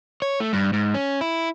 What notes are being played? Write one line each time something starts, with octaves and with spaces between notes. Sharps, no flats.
C#5
A3
G2
G#2
C#4
E4